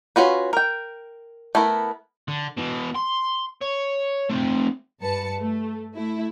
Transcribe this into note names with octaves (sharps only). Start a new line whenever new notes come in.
C#4 F4 F#4 B4
A#4 G5
A3 B3 E4 A#4
D3
B2 E3
C6
C#5
A3 C4
G2 B4 A5 C#7
A3
A3 E4